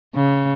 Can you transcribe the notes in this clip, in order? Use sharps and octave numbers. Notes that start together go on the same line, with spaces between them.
C#3